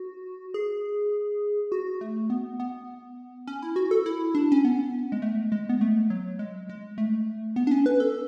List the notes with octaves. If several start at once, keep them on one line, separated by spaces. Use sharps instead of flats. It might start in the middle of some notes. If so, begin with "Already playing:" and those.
Already playing: F#4
G#4
F#4
A3
B3
B3
C#4
E4
F#4
A4
E4
D4
C#4
B3
G#3
A3
G#3
B3
A3
F#3
G#3
G#3
A3
B3
D4
C#4
B4
A4